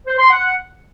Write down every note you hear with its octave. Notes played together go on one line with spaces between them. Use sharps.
C5
C6
F#5